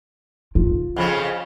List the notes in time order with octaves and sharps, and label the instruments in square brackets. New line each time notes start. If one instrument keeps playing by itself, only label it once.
[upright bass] F4
[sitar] F2 C#3 F3